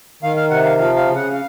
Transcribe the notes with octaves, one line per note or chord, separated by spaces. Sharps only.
D#3 F5
F5
C3 F#5
F5
F3 F5
F5
C#3
F#5
F5